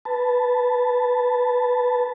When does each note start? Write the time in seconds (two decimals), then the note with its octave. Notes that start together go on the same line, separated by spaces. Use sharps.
0.05 B4 A5